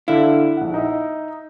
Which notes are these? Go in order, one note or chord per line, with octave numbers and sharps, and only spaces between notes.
D3 E4 F5
A#1 F#5
D#4 D#5 E5